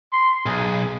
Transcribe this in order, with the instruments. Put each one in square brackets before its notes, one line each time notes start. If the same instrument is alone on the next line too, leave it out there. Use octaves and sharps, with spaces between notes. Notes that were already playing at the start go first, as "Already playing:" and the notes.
[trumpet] C6
[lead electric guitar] B1 [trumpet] G#4